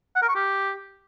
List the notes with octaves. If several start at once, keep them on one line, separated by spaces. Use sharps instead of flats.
F#5
A#4
C#6
G4